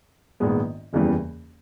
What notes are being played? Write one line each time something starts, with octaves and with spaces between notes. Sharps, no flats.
A#1 G#2 D#3 G#3 B3
F#1 E2 C#3 E3 G3